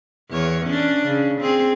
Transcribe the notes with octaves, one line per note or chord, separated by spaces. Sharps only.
E2 C#5
C#4 D4
C#3
C4 G#4